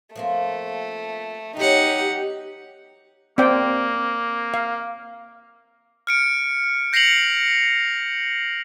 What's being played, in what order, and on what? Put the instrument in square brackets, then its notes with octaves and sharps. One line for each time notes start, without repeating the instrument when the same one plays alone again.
[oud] F3 A#3 C4 [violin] A3
[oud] F#3 B3 [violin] D#4 F#5 [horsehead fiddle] G4
[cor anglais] A#3 [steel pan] C4 D5 G5
[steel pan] F5
[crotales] F6 C#7 D7
G6 A#6 C7 C#7 F7 F#7